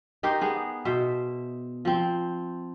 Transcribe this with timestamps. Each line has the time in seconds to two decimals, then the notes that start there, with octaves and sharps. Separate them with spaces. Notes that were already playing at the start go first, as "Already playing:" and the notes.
0.23 D#4 G4 A#4 C5
0.41 B3 G#4
0.85 B2 C5 E5
1.85 F3 C4